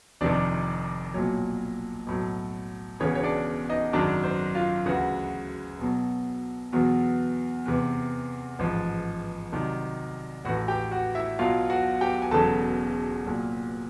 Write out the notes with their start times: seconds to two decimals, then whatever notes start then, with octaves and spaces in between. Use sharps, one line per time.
0.21 F1 F2 C3 D#3 D4 D5
1.14 B1 A#2 F#3 C#5
2.07 B1 A2 F#3
3.00 E1 E2 C#3 E3 C#5
3.15 C#5
3.23 D4 D5
3.70 D#4 D#5
3.93 G#1 F#2 D#3 F#3 D4 D5
4.24 C5
4.55 F4 F5
4.86 D2 C#3 E3 F#4 F#5
5.79 B1 B2 F#3
6.72 E2 B2 F#3
7.65 E2 C3 E3
8.59 A1 G#2 F3
9.52 C2 C3 D#3 F#3
10.45 A1 A2 E3 F#4 F#5
10.68 G4 G5
10.91 F#4 F#5
11.15 E4 E5
11.39 B1 B2 F#3 F4 F5
11.70 F#4 F#5
12.01 G4 G5
12.22 G#5
12.31 E1 E2 C#3 F#3 A4 A5
13.24 C2 A#2 F#3